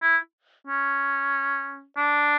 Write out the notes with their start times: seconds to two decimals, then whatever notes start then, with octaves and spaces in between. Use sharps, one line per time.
0.02 E4
0.67 C#4
1.97 D4